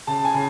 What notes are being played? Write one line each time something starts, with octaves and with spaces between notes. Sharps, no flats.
C#3 A5
G#5
C#3